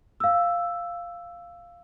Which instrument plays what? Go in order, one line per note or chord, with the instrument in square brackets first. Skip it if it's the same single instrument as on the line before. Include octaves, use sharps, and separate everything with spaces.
[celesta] F5 E6